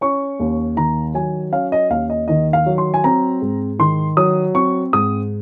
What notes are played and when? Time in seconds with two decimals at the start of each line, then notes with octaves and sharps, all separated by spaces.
0.01 C#4 C#6
0.40 D#2
0.77 D#3 A#5
1.14 F#3 G#5
1.52 C#4 F5
1.72 D#5
1.90 D#2 F5
2.10 D#5
2.28 D#3 D#5
2.53 F5
2.66 F#3
2.78 C6
2.94 G#5
3.04 C4 A#5
3.42 G#2
3.79 D#3 C6
4.17 F#3 D#6
4.55 C4 C#6
4.93 G#2 D#6